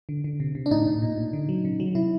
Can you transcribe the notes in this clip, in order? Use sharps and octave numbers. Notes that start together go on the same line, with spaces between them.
D3
D3
C3
C3
D4
A2 D#4
A2
A#2
A#2
D3
F#3
C#3
F#3
C3 E4